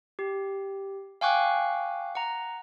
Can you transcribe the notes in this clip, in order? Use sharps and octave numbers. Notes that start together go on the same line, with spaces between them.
G4
F5 G5 G#5 C#6 D6 F#6
F#5 A#5